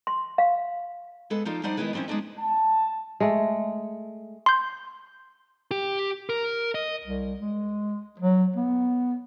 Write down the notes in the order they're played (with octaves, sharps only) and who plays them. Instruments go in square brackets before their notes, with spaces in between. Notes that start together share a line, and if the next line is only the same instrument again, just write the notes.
[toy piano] C6
F5
[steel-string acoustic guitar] G#3 B3 A4 B4
F3 D#4 F4 A4 D5
G3 D4 D#4 C5 D5 F#5
D#3 F#3 G#3 B3 E4 B4
F3 G3 C4 C#4 E4
G#3 B3 D4 D#4
[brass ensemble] A5
[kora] G#3 A3
[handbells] C6 G6
[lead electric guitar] G4
A#4
D#5
[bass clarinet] C2
G#3
F#3
B3